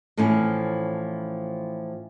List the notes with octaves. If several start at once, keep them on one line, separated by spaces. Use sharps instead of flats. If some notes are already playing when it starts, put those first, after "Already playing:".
A2 E3 F3 C4 C#4 C#5